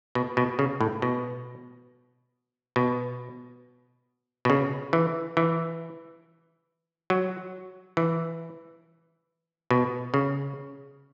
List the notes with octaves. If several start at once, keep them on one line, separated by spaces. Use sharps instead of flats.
B2
B2
C#3
A2
B2
B2
B2
C#3
E3
E3
F#3
E3
B2
C#3